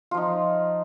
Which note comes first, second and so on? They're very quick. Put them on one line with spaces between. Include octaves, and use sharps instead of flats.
F4 F3 D#4